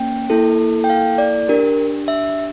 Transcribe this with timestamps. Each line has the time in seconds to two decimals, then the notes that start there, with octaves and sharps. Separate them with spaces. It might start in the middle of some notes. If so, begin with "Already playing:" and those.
Already playing: A#3 C#4 G5
0.30 A#3 E4 A4
0.84 G5
0.90 F5
1.18 D5
1.48 D4 G4 A#4
2.08 E5